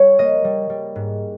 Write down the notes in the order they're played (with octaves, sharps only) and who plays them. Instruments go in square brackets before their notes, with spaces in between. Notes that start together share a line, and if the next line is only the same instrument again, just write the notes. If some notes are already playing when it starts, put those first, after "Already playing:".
Already playing: [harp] G3 C#5
A#3 D#5
G3
G3
G#2